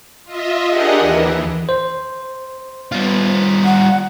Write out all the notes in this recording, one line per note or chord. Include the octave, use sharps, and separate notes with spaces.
F4 D#5 E5
D4 G4 G#4 A#4 D#5 F#5
D#2 E3
C5
G3 B3 F4
F#5